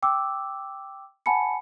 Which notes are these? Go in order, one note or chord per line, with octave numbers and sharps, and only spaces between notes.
G5 D6 E6
F#5 G#5 A5 B5 C#7